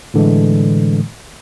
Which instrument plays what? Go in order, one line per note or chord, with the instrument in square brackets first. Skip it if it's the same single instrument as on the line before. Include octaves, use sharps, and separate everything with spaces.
[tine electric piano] A2 D3 E3 G#3